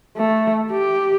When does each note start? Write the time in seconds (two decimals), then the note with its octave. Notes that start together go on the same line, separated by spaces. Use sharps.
0.17 A3
0.71 G4